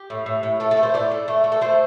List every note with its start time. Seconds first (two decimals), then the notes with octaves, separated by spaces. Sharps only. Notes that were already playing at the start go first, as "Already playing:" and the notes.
Already playing: G4
0.10 A2
0.26 A2
0.43 A2
0.60 A3 A4
0.71 A4
0.77 A3
0.83 C5
0.94 A2 D5
1.11 A3
1.28 A3
1.44 A3
1.52 A4
1.61 A3 C5